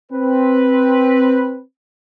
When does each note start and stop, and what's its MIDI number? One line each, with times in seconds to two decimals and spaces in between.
0.12 1.61 60
0.12 1.61 71